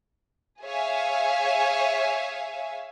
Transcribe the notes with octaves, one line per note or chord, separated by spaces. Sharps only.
G#4 C#5 E5 F5 G#5